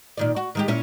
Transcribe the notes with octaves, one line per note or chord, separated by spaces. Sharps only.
A#2 D#3 D5
F#4
D#3 G#3 G4
A#2 C#4 E4